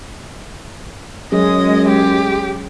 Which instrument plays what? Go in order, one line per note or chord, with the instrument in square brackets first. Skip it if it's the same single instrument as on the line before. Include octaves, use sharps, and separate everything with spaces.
[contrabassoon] F#2 [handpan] F#3 C#4 G#4 [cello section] G#3 [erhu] D#5
[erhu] G4